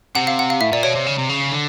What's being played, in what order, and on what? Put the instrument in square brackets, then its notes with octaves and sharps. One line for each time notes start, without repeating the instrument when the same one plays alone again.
[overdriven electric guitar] C3 [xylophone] F#5
[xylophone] F5
F#5
F5
[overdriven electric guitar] A2 [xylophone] E5
[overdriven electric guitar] A#2 [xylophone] D5
[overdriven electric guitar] B2 [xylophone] C#5
[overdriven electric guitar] C3
C#3
C3
C#3
D3